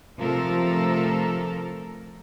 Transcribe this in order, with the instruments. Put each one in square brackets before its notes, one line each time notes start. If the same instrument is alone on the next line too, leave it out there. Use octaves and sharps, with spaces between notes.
[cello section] C3 F3 A3 A4 A#4